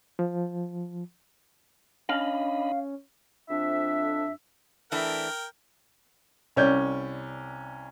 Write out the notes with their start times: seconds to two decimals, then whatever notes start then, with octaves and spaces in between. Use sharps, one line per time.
0.19 F3
2.09 C#4 D4 D#5 F5 B5
3.50 F2 D4 E5
4.92 E3 A3 D4 A#4 G5
6.56 C2 C#4 D5 G6